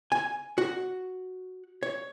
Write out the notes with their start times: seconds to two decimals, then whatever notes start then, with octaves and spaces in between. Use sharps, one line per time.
0.12 G#5
0.58 F#4
1.83 C#5